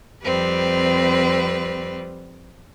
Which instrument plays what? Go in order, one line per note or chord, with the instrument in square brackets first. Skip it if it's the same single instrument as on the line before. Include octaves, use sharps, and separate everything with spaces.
[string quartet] F2 G3 C4 B4